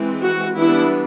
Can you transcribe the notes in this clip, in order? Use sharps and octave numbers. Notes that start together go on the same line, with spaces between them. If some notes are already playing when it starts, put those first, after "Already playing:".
Already playing: E3 G#3 C4
F#4
E3 G3 B3 D4 E4